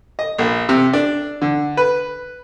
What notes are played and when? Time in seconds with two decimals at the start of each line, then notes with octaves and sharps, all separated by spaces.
0.19 D#5
0.38 A#1
0.69 C3
0.93 D4
1.42 D3
1.77 B4